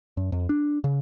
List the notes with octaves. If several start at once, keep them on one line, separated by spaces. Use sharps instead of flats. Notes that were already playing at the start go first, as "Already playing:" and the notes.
F#2
F2
D4
C#3